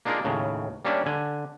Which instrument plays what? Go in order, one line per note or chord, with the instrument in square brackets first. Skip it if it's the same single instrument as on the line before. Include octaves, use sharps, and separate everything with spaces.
[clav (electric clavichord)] A#3 D4 D#4 F4 G#4 A#4
D#2 A2 C#3
G3 A#3 C#4 D4 D5 E5
D3 G#5